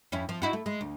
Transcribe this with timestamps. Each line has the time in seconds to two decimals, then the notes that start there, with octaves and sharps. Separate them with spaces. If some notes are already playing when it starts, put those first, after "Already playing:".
0.12 F2 C#4 E4
0.29 F3
0.42 D#4 E4 F#4
0.53 A3
0.66 G#3
0.81 D2